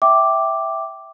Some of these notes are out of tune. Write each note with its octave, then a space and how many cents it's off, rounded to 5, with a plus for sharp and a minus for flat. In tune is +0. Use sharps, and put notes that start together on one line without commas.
E5 +0 G5 -10 D6 +0